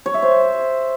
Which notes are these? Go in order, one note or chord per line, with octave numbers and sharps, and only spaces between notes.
C#5
E5
C5